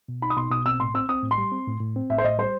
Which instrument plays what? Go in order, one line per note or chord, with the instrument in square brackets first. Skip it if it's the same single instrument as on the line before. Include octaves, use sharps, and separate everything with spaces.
[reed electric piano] B2
[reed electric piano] D#4 [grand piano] B5
[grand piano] D#6
[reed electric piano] B2 [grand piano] C6
[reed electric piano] B2 [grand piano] D#6
[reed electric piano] C4 [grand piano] E6
[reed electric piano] A2 [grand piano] C6
[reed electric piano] C4 [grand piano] E6
[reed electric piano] C4 [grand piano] D#6
[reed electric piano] A2
[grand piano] C6
[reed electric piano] G3
C4
A2
A2
C4
[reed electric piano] A2 [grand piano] E5
[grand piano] C5
[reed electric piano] A2 [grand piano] D#5
[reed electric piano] G3 [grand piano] C5